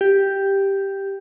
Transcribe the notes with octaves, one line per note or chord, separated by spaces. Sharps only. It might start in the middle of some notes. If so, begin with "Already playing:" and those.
G4